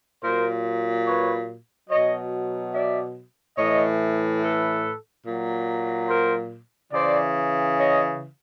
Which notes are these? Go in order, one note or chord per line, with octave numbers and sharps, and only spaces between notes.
A#2 F#3 A#4 C5
B4 C#5
B2 F#3 C#5 D#5
D5 E5
A2 E3 C#5 D#5
A4 B4
A#2 F#3
A#4 C5
C#3 E3 C5 D5
C#5 D#5